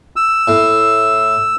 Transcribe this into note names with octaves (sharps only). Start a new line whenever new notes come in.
E6
A2